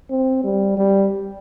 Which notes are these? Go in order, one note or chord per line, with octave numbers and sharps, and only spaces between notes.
C4
G3
G3